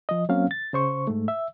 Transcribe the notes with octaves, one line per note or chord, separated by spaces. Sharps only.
F3 D#5
F#3 A#3 C4 C#4 F5
A6
C#3 C5 C#6
G#2 A3
E5